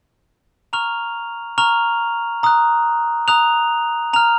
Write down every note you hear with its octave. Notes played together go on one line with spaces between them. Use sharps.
A#5 C#6 F6 F7
A#5 C#6 F6 F7
A#5 D#6 F#6
A#5 D#6 F#6 F7
A#5 F6 F7